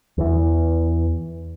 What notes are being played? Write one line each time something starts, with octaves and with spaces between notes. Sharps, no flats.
E2 E3